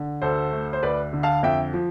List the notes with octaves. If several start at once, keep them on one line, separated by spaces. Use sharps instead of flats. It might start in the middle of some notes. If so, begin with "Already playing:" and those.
Already playing: D3
D2 A4 C5
A3
C5
D2 B4 D5
D3
F5 A5
F2 E5 G5
F3